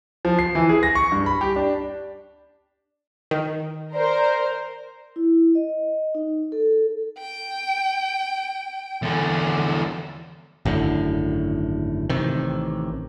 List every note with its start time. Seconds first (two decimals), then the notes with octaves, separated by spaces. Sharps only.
0.25 F3
0.39 C7
0.55 E3
0.69 G#4
0.83 A#6
0.95 C#6
1.12 G2
1.26 B5
1.41 G4
1.56 D4
3.31 D#3
3.94 A#4 C5 D5
5.16 E4
5.55 D#5
6.15 D#4
6.52 A4
7.19 G5
9.02 E2 D3
10.65 G#1 F#2 A2 D3
12.09 A1 C3 D#3